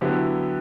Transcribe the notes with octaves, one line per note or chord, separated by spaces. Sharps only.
D3 F#3 B3 E4 G4